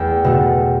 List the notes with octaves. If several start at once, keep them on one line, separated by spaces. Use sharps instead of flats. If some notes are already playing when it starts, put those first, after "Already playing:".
Already playing: E2 A3 G5
B2 A3